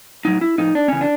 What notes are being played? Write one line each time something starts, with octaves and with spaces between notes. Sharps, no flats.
A2 F#3 D#4
E4
A2 F3 D#4
D4
C#3 E3 C#4
D4